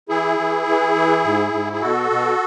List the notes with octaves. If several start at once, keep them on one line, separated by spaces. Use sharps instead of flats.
E3 E4 G#4
E3
E3
E3
G#2
G#2
G#4
B2 F#4 A4
B2